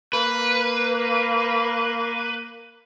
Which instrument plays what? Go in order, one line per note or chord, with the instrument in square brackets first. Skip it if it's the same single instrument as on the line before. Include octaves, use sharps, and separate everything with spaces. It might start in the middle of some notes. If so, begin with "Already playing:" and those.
[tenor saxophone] A#3 [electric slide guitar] B4